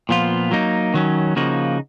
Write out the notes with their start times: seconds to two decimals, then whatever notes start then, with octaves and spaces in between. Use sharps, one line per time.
0.09 A#2 F3 B3 F4
0.51 F#3 A#3 D#4
0.94 D#3 F#3 C#4
1.36 C#3 F3 A#3 D#4 F#4